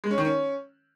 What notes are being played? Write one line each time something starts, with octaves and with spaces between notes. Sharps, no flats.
G#3
C#4
D#3
C#4